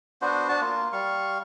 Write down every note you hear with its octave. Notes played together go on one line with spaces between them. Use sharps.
B3 D4 F#4 C5
D4 F#4 A5
A#3 F4
G3 F5 C#6